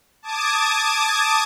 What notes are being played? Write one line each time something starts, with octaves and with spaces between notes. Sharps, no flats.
A5 D6 D#6 G#6